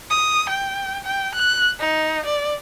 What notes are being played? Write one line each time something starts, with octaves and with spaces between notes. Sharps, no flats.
D#6
G5
G5
F#6
D#4
D5